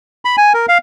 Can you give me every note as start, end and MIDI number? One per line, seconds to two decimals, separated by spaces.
0.25 0.36 83
0.37 0.53 80
0.54 0.66 70
0.69 0.78 77